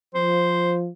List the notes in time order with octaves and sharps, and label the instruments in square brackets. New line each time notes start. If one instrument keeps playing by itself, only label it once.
[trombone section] F3 [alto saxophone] C5